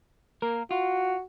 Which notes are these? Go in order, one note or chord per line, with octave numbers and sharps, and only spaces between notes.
A#3 A#4
F4 F#4